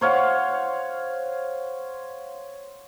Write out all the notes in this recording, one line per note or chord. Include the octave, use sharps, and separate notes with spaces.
C5 C#5 F5 F#5